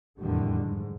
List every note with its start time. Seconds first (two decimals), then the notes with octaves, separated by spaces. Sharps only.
0.20 F1 E2 A2 D3 D#3 G3
0.64 G#2